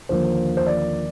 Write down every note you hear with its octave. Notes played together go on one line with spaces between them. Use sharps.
D#2 D3 F3 A#3 C5
C5
D5